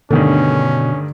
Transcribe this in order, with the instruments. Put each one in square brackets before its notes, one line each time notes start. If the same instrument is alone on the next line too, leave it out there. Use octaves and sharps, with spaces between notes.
[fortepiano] G2 D#3 A3 [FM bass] B2 [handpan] D3 [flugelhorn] C#4